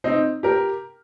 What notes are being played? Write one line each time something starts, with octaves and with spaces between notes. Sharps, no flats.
C4 D#4
G4 A#4